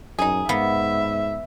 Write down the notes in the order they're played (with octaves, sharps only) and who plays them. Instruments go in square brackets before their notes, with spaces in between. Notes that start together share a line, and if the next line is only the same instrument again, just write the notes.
[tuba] F#2 [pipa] D#4 G#4
[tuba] G#2 [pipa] A#3 [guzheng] B3 [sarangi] E5